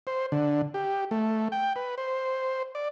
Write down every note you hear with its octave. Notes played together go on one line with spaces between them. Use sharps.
C5
D3
G4
A3
G5
B4
C5
D5